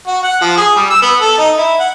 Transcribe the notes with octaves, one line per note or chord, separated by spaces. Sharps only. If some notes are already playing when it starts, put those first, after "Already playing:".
F#4
F#5
F3
G#4
G3
E6
B3
A4
D#4
E4
F#5